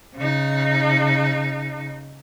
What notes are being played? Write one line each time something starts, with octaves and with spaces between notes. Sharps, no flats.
C#3 D#4